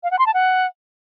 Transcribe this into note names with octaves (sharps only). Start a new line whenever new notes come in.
F5
F#5
C6
A5
F#5